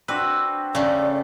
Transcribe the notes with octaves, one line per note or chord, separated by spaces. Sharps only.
C4 D4 F#4 B4
C#3 A3 D5